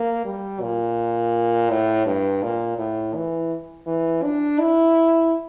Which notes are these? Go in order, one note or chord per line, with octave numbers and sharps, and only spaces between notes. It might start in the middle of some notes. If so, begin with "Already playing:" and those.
Already playing: A#3
G3
A#2
A2
G2
A#2
A2
E3
E3
D4
E4